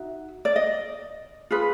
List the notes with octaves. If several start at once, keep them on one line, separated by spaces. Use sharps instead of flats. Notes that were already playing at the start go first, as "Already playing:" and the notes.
Already playing: D#4 F#4 E5
D5
D#5
F4 G#4 B4